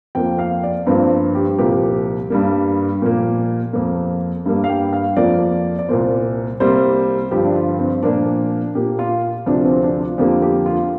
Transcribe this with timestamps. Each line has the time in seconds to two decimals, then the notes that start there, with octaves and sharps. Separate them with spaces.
0.15 F2 F3 A#3 G5
0.39 F5
0.63 D5
0.87 G2 F3 A#3 C4
1.11 F4
1.35 G4
1.58 C2 A#2 F3 A#3 G4
2.30 G2 G3 A#3
3.02 A#2 F3 A#3
3.73 F2 F3 A#3
4.46 G2 G3 A#3
4.64 F5
4.69 G5
4.93 F5
5.16 F2 F3 A#3 D5
5.79 D5
5.89 C2 A#2 A#3 C5
6.60 C2 C3 G3 A#3 C5
7.31 G2 D3 F3 G4
7.44 D4
7.55 F4
7.79 C4
8.03 A#2 F3 A#3 D4
8.75 A#2 A#3 G4
8.99 F4
9.46 D2 C3 F3 D4
9.64 C4
9.82 D4
10.00 F4
10.18 F2 D3 F3 A#3 G4
10.42 G4
10.66 F4